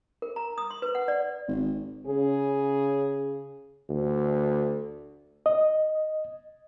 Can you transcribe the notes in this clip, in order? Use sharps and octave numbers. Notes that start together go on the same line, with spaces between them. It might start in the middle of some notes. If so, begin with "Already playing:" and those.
A#4
A#5
D#6
C6
B4
F#5
D5
G#1
C#3 G#4
D2
D#5